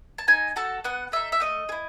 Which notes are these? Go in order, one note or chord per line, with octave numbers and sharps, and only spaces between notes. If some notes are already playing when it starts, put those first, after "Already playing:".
A5
D#4 G#5
F#4 A4 A5
B3 F#5
D#4 A4 E5
E5
A3 D#5
G#4
E4